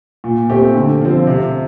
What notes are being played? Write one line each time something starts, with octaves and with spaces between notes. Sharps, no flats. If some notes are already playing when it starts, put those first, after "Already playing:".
A#2
A3 C4 G4
D3
F3 C4
C3